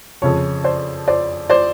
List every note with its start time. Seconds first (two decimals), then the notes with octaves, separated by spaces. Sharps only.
0.22 F2 C#3 F3 C#5
0.64 C5 D5
1.08 C5 D5
1.50 C5 D5